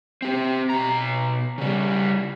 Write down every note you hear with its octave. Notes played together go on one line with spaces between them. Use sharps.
C4 G4
B2 A#5
C#3 G3